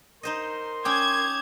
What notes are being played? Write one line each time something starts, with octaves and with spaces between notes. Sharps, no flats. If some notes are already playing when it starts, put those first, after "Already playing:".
D#4 A#4 C5 D#5 C6
C#4 G5 D6 D#6 G6 G#6